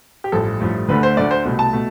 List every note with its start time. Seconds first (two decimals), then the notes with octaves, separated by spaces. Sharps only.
0.24 G4
0.32 A1 G2 F3 A3 A4
0.60 A1 G2 F3 A3
0.88 D2 D3 A3 B4
1.03 C5
1.16 D2 D3 A3 D5
1.31 C5
1.45 C2 B2 A3
1.59 A5
1.73 B2 A3